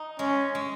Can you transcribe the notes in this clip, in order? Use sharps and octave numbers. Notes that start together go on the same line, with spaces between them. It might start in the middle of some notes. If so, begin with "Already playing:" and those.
Already playing: D#4
G#3 C#4
G#3